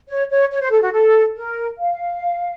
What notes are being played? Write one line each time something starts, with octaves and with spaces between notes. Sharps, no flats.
C#5
C#5
C#5
C5
A4
F#4
A4
A#4
F5